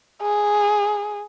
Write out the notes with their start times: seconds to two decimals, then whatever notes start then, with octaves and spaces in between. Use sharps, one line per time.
0.21 G#4